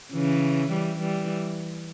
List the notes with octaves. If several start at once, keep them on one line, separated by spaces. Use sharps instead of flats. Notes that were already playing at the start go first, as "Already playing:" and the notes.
C#3 E3
E3 G3
E3 G3